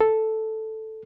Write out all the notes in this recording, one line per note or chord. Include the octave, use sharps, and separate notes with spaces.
A4